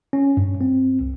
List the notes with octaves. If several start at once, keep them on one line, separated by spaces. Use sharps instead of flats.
C#4
G2
C4
C2